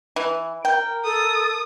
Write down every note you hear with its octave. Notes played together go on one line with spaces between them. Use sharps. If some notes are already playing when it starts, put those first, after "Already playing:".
E3
A#4 G5
A4 D#6